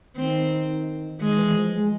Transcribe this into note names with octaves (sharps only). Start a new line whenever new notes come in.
D#3 C4
D#3 G#3
E3
F3
G#3